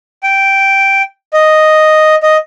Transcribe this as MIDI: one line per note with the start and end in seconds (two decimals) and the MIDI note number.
0.23 1.02 79
1.34 2.15 75
2.23 2.37 75